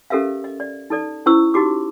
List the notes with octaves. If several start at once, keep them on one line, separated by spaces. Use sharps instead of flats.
C#4 G4 A4 A#4 E5 F5
D#5
D5
D#4 A4 D5
C#4 E4 C5 C#6 E6
D#4 F#4 G4 D6